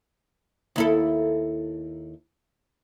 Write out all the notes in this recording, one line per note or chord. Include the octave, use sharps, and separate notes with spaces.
D#2 E4 A4